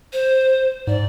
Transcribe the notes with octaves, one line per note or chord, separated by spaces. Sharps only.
C5
G#2 D5